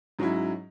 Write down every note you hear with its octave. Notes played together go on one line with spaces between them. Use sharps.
G#2 F#3 C#4 E4